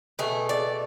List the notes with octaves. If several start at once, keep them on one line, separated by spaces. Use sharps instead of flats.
B2 A3 G#4
D5